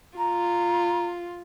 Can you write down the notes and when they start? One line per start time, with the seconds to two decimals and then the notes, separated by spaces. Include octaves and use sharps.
0.18 F4 A#5